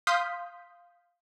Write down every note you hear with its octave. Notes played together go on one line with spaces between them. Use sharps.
F5 C6 D#6 F6 G6 B6